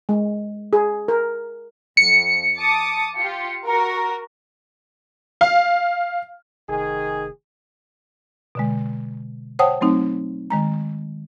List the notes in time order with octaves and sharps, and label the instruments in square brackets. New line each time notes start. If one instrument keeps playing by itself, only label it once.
[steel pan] G#3
G#4
A#4
[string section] F2 [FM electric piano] C#7
[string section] A5 D6 D#6
F4 G4
F#4 A#4
[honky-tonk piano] F5
[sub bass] F1 [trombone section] D#3 G#4
[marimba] B2 D3 G#3
C5 C#5 F#5 G5 A5 D#6
F#3 A3 C4 D#4
D#3 G#3 A#5